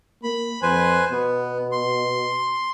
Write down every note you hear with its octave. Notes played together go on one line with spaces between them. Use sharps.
A#3 B5
F2 B4 C5 G#5
B2 B3
C6